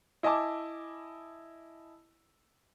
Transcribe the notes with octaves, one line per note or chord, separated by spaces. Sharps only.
E4 D#5 G#5 A5 D6